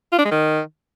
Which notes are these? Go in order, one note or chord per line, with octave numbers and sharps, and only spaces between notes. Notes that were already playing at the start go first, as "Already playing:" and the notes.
F4
D4
G#3
D#3